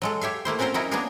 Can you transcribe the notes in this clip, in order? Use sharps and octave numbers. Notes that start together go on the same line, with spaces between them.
F#3 G#3 A4
G4 C#5 E5 F5
A3 A#3 E4 C5
C4 C#4 F#4 A#4 C5 A#5
F#3 C#4 D#4 E4 F#4 A#4
A#3 B3 D4 F#4 G#4 A#4